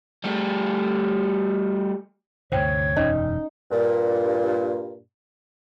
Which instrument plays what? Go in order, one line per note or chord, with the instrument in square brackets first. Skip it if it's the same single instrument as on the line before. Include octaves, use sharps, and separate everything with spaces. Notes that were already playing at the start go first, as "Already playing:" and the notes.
[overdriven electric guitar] G3 A3
[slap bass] D2 G2 C3 [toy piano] C5 G5 [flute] C#5
[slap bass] E1 F#2 [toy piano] C#4 [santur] D#4
[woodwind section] G2 A#2